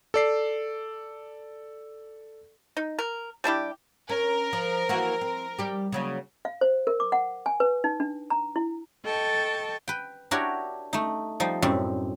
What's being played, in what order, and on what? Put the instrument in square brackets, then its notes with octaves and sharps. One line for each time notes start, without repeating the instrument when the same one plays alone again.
[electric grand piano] A4 D5 C7
[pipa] D#4
A#4
G3 D4 E4 G4
[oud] C#4 [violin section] A#4
[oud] F3
E3 A#3 F#4
C4
G3 G4
C#3 F#3 A#3
[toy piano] F5
C5
A#4
D6
F#5
G#5
B4
D#4
D4
A#5
E4
[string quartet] A4 D#5 G5 A5 C#6
[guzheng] B4 G5
D4 E4 F#4 G4 A#4 C#5
A3 D#4
F3 G3 D#4
F#2 A2 G3 C4